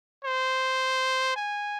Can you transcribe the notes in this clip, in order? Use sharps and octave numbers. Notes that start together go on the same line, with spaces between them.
C5
G#5